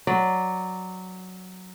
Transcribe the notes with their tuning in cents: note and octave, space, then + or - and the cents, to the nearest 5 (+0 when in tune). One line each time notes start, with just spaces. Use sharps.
F#3 +0 D5 +0